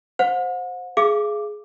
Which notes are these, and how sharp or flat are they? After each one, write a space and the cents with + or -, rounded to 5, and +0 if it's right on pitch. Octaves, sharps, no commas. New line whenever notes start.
C5 +0 F#5 -40
G#4 +15 F5 -35 D6 +0